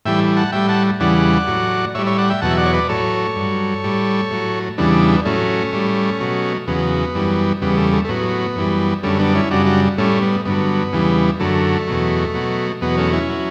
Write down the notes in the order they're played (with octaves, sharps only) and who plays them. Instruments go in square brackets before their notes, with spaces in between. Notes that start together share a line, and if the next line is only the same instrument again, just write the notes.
[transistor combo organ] A2 E3 G3 E5 G5
F#5 A5
A2 G3 E5 G5
F#5 A5
E2 C#3 E3 G3 D5 F#5
A2 F#3
A2 G3 C#5 E5
C#5 E5
D5 F#5
E5 G5
E2 B2 F#3 F#5 A5
E5
D5 F#5
C#5
B4 D5
A2 F#3 A4 C#5
G2 F#3
A2 G3
A2 F#3
E2 C#3 E3 G3 B3 D4
A2 F#3 A3 C#4
A2 G3
B2 F#3
E2 C#3 F#3 B3
F#2 E3 G3
E2 C#3 G3 B3
A3
A3
A3
A2 F#3 B3
F#2 E3 G3
F#2 D3 G3 A3 C#4
B3 D4
C#4 E4
F#2 C#3 G3 D4 F#4
D4 F#4
A2 G3 A3 C#4
B3
G2 D3 F#3 B3
E2 C#3 E3 G3
F#2 D3 F#3 A3
E2 B2 F#3
B2 F#3
E2 B2 F#3 B3
A3 C#4
C#4 E4
F#3